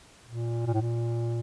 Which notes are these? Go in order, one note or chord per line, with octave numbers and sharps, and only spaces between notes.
A#2
A#2
A2
A#2